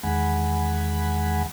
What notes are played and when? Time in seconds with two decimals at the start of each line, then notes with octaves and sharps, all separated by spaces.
0.03 E2 D#3 G#3 F#5 G#5 B5